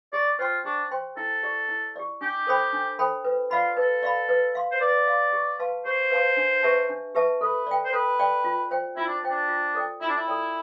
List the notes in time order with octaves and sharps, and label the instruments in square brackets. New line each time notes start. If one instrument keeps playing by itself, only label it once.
[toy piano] G4 [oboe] D5
[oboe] F4 [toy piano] C5 G5 C6
[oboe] D4 [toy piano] G4
[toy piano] C5 G5 C6
[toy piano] E4 [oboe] A4
[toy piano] G4 D5
E4
G4 D5
[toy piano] D4 [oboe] G4
[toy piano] A4 C5 G5 B5
D4
A4 C5 G5 B5
B4
[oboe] F4 [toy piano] D5 F5 B5
[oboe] A4 [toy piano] B4
[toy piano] D5 F5 B5
B4
F5 C6
[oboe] C5
[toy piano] B4 [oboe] D5
[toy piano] F5 C6
G4
B4 F5 A5 C6
[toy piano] G4 [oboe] C5
[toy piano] B4 F5 A5 C6
D4
G4 B4 E5 A5
D4
G4 B4 E5 A5
[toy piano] A4 [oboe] B4
[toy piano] D5 G5
[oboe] C5
[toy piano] A4 [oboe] B4
[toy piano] D5 G5
F4
C5 G5
[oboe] E4 [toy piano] F4
[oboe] D4
[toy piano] C5 G5
[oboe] D4
[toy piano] F4
A4 D5 G5
[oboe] E4 [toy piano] F4
[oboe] D4
E4
[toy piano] A4 D5 G5